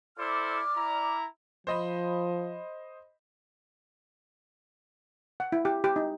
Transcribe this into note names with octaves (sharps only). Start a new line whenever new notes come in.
E4 A4 C5 D5 D6 F6
E4 A#5
F3 C5 D#5 B5
F#5
E4
G4
G4
D#4